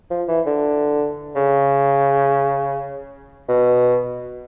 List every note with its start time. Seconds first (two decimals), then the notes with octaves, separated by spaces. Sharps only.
0.11 F3
0.28 E3
0.46 D3
1.35 C#3
3.49 B2